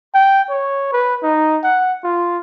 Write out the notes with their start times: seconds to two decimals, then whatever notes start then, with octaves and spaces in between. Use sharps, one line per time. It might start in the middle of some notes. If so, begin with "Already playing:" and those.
0.14 G5
0.50 C#5
0.92 B4
1.23 D#4
1.63 F#5
2.04 F4